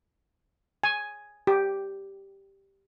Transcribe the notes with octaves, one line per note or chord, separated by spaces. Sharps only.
G#5
G4